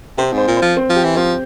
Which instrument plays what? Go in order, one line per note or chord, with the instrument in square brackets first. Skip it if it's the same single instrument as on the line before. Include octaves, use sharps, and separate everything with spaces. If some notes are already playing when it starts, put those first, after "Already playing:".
[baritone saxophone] C3 [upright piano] C4
[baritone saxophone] G#2
[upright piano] C5
[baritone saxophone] A#2
[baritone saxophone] F3 [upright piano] C5
[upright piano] C4
[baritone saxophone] F3
[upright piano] G4
[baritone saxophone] E3
[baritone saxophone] F3 [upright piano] C4